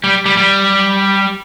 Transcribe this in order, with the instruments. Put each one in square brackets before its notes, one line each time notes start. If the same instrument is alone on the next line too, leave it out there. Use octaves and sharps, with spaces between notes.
[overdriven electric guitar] G3
G3
G3